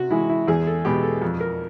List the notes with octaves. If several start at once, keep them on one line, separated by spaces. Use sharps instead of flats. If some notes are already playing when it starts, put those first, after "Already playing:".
Already playing: C3 F#4
E3 G#3 E4
E4
E2 G#4
A4
B2 G#3 G4
A4
F2
A#4